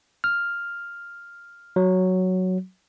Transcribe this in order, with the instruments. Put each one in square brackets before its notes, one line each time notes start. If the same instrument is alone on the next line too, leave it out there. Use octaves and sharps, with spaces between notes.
[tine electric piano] F6
F#3